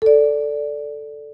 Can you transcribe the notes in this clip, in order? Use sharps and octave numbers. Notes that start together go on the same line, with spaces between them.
A4 D5